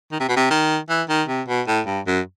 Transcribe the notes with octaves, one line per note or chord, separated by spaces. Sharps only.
D#3
C3
B2
C3
D#3
E3
D#3
C3
B2
A2
G2
F#2